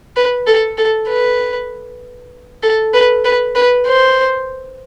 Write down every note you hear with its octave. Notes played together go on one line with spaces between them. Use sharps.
B4
A4
A4
B4
A4
B4
B4
B4
C5